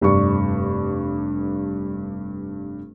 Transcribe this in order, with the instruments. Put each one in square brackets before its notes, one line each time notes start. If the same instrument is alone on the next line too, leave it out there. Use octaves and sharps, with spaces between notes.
[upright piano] F1 G2 D4 C#6